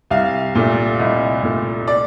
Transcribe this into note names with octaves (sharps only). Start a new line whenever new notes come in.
C2 F5
A#2 A3
C2 D#5
A#2 A3
D5